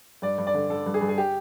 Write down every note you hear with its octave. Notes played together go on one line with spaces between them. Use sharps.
G2 D5
G2
D5
D3
D3 A4
G2
G#4
G2
G#4
G4